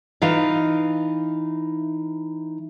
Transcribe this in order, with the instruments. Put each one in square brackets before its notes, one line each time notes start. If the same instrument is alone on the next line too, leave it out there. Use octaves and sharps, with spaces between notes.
[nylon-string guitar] E3 D#4 F4 F5